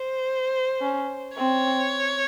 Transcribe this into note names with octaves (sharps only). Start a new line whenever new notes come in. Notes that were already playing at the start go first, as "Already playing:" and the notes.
Already playing: C5
C#4
C4 C#5